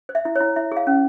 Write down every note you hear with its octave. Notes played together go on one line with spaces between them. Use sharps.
C5
E5
E4
C#5
E4
E4 E5
G#4
F5
C#4